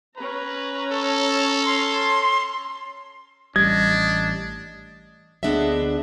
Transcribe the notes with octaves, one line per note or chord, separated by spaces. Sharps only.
C#4 B4 A#5
A4
C6
A1 G3 D4 D#5 G#6
D2 B3 D4 G#4 D#5 E5